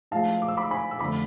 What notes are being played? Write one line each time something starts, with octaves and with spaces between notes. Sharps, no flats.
A2 F3 G#3 F5 A5
D6
E6
B5 D6
G#5 B5
E6
F2 D3 A3 B5 D6